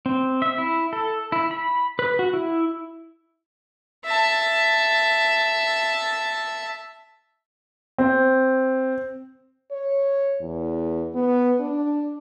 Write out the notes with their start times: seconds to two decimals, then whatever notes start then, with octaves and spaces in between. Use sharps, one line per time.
0.06 C4
0.42 E5
0.58 E4
0.93 A4
1.32 E4
1.51 B5
1.99 B4
2.19 F#4
2.33 E4
4.05 E5 A5
7.98 C4
9.71 C#5
10.41 E2
11.15 B3
11.60 D4